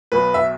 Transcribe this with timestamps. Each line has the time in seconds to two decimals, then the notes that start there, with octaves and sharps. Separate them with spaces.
0.12 B1 B2 B4
0.34 E5